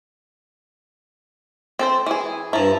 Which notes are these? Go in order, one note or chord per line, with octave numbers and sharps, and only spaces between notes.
C4 A4 C5
E3 G#4
G2 F3 E4 A5 A#5